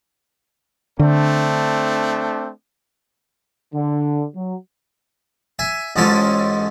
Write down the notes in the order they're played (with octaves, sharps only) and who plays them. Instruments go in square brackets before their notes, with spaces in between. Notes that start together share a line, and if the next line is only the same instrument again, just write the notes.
[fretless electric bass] D3 [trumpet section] A3 C4 D4
[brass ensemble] D3
F#3
[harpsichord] E5 G#5
A1 G#2 G#3 C#4 F4 A4